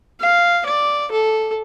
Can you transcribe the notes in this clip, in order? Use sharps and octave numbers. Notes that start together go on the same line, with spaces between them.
F5
D5
A4